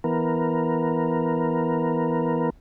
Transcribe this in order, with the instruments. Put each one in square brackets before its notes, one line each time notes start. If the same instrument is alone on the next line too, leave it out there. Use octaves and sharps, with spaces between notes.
[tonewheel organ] E3 B3 A#4